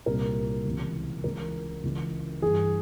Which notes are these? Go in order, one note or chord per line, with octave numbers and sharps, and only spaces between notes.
C2 A#2 A#4
C#2 C3 E3
C#2 C#3 E3 A#4
C#2 C#3 E3
G2 E3 G#4